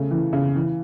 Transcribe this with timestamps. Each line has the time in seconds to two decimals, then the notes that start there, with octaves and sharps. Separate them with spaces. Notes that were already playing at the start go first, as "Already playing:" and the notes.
Already playing: C#3 A3
0.11 E3
0.33 C#3
0.55 E3